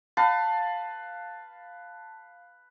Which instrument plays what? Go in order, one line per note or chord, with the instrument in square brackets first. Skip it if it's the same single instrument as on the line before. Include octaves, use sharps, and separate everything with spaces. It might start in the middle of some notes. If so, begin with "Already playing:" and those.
[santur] B4 F5 A5